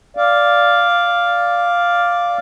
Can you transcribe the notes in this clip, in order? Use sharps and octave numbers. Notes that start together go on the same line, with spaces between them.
D5 F5